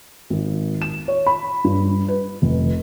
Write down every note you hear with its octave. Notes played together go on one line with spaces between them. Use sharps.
G#1
E7
C#5
B5
G2
B4
F1